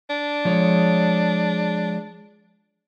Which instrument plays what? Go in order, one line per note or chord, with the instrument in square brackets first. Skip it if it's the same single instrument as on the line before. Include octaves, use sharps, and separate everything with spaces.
[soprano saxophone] D4
[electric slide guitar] F3 G#3 C#5